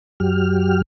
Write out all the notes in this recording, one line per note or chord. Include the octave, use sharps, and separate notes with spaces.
F#2 F#3 G4 F6